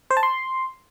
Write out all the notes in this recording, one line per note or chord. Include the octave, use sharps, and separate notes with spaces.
C5
A5
C6